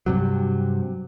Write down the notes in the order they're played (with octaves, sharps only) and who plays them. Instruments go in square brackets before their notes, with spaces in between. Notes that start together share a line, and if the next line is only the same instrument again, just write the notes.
[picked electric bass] G2 C3 F#3